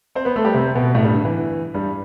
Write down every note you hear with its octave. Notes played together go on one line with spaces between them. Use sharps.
C4 C5
B3 B4
A3 A4
G3 G4
C3 C4
B2 B3
A2 A3
G2 G3
D3
E3
G2 G3